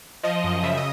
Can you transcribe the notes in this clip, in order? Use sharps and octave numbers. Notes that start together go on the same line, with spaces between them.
F3 D#5
F#2
C#3 E5
D#5